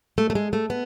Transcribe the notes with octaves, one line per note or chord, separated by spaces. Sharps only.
A3
A3
G#3
A3
B3